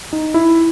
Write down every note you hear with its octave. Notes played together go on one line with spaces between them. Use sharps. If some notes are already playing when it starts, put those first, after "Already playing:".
D#4
E4